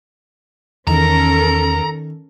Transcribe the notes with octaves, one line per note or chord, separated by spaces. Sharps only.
E2 D#3 C#4 A4 A#4 A#5